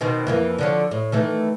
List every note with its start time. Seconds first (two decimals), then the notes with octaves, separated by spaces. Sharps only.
0.01 B2 D#3 C4
0.27 F2 E3 A#3
0.58 D3 F3 C#5
0.91 A2
1.12 D#3 E3 A3